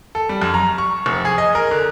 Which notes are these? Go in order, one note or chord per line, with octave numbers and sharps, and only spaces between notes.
A4
G3
F#2
A#5
C#6
F1
G#4
D#5
A#4
D3